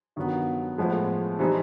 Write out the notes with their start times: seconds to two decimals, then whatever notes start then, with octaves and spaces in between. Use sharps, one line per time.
0.16 G2 D#3 F#3 B3
0.78 A2 F3 G#3 B3
1.39 C3 E3 G3 C4 D#4